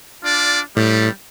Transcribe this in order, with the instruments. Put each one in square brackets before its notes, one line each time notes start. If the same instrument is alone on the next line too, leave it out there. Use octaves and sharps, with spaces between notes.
[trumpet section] D4 F4 D5
[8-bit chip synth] A2 [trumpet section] G3